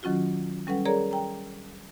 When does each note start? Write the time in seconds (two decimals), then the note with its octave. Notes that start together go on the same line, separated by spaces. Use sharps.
0.03 D#3 F#3 C#4 F4 F#4
0.67 G3 C#4 A4 B4 F#5
0.85 G#4 A#4 C#5 D5 A#5
1.11 G5 A#5